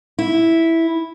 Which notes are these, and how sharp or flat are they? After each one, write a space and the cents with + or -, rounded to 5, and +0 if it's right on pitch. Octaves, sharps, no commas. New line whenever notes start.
E4 -5